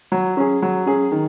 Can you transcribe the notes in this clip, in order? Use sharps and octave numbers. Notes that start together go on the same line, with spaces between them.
F#3
C#4 G#4
F#3
C#4 G#4
D#3